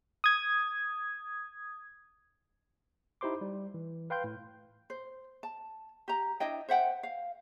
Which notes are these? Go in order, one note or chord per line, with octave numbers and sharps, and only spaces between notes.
D#6 G#6
D#4 E4 G4 C5 C6 D6
G3
E3
B4 F5 G5 C6 G6
A2
C5
A5
G4 A#5
D4 E4 D#5 G5
C5 E5 F#5 G5
F5